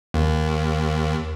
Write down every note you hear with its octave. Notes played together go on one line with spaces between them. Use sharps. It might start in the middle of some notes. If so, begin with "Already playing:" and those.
D#2